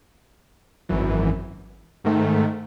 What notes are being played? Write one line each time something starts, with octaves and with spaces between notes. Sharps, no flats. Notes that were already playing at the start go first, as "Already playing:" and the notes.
G#1 F#2 E3
G#2 D#3 A3